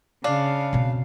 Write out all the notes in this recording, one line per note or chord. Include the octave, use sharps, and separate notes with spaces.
C#3 D4 F5
B2 C4